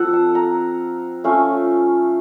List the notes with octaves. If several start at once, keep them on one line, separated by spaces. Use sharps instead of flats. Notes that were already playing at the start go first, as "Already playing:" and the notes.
Already playing: F3 C4 F4 A4 F#5
A5
A#5
A3 C#4 F4